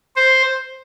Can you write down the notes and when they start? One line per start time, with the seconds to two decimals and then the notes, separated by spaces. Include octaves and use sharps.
0.16 C5